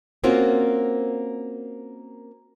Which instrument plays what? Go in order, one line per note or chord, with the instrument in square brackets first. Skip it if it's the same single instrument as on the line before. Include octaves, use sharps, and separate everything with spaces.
[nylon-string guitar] A#3 C4 C#4 F4 F#4 A#4